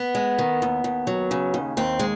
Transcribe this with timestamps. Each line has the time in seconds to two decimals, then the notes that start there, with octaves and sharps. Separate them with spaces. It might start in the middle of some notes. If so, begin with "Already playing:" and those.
Already playing: B3
0.15 G#3
0.39 D#3
0.62 D#2
0.84 D#2
1.07 F#3
1.31 C#3
1.54 D#2
1.77 D#2 C4
1.99 G#3